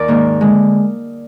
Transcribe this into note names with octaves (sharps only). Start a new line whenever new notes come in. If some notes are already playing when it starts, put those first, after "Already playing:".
Already playing: D#2 A#4 D5
G#2 D#3 A#3
D3 G#3